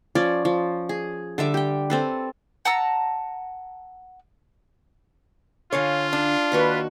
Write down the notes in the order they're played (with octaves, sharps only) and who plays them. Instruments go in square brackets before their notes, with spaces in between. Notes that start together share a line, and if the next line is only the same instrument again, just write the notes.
[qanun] F3 C#4 D5
F3
G#4
D3 G3 E5 D6
G4 G5
C4 A4 B4
[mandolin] F#5 A5 A#5 E6
[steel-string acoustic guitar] D3 F5 G#5 [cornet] F4 [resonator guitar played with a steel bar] C#5
[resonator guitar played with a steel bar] D4
[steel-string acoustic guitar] D#2 D#3 F#4 [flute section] B4